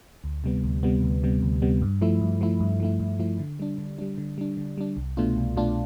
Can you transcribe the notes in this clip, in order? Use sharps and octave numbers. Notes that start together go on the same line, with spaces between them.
D2
C3 G3 B3
D2
C3 G3 B3
D2
C3 G3 B3
D2
C3 G3 B3
G2
F3 A3 E4
G2
F3 A3 E4
G2
F3 A3 E4
G2
F3 A3 E4
D3
G3 D4
D3
G3 D4
D3
G3 D4
D3
G3 D4
C2
B2 A3 D4 F4
C2
B2 A3 D4 F4